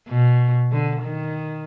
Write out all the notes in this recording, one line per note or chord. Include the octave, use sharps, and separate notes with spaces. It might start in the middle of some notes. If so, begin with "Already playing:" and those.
B2
D3
D#3